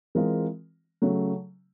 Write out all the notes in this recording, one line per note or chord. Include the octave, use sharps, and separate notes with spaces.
E3 G#3 C4 F4 A#4
C#3 F#3 A3